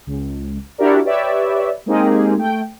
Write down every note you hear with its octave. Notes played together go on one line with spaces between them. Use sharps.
C#2
D4 E4 F#4 G4 A#4 D5
G4 B4 C#5 D5 E5
G#3 A#3 C4 D#4 G4 G#4
A3 G5